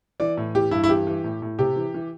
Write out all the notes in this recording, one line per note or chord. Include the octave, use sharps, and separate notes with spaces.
E3 D5
A2
E3 G4
G2 E4
E4
E3 G4
E3
A2
A2
C3 G4
E3
E3